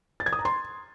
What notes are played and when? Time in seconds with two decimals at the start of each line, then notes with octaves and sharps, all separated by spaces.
0.20 A6
0.26 G#6
0.33 D#6
0.39 A#5
0.45 C6